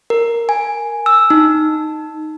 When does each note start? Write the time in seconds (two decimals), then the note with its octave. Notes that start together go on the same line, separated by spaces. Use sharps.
0.10 A#4
0.49 G#5
1.06 E6
1.30 D#4